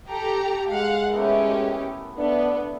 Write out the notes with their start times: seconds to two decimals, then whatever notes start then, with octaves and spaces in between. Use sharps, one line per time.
0.11 G4 A4 A#5
0.69 G#3 F5 F#5
1.13 A3 B3 C#4 E4 G4 A#4
2.19 A3 B3 D4